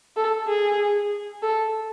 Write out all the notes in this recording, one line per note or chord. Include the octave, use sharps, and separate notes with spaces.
A4
G#4
A4